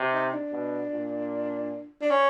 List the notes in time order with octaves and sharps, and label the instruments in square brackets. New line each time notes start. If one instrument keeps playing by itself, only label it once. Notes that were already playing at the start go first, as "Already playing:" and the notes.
Already playing: [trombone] C3
[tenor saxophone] D#4
D4
[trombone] B2
A#2
[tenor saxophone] D4
C#4